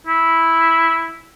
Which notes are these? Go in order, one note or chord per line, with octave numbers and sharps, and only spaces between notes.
E4